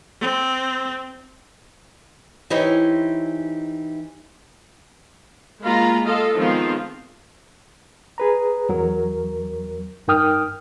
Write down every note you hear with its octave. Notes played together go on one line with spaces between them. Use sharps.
C4
E3 D#4 E4 G4 C5 C#5
G#3 A#3 F4 A#5 B5
F4 A4 D#5 F5
D#3 F3 G#3 B3 C4 F4
G#4 B4 A#5
E2 F#3 A#4
G2 D#4 A#4 G5 D#6 F6